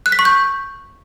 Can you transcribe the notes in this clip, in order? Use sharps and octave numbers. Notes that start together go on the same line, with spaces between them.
F#6
B6
C#6
G6